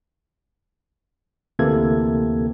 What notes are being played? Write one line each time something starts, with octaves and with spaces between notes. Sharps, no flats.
D2 C3 E3 A#3 A4 G#6